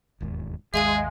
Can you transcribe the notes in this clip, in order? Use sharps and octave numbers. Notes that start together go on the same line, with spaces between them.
E1 D#2 G#2
G#1 D#2 G#3 G#4 E5 F5 G#5